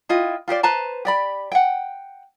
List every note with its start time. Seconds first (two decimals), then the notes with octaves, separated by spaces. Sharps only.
0.09 E4 F4 D#5 G5
0.48 F4 G4 C5 D5
0.63 B4 C5 A5 A#5
1.05 G4 D5 B5
1.52 F#5 G5